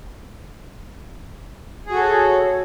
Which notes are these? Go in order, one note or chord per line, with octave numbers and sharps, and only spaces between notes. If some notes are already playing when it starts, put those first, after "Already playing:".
F#4 G#4 A4 C#5